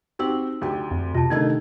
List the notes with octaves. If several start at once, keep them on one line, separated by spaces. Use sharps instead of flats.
C4 D#4 F#4 G4 E6 F#7
D2 G4
F2
C3 F4 A5
D3 D#3 A3 D#4 G#6